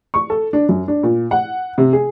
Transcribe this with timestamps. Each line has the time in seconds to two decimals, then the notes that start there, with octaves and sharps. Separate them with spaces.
0.14 C#6
0.30 A4
0.53 D4
0.69 F#2
0.88 D4
1.03 A#2
1.31 F#5
1.78 C3
1.93 G#4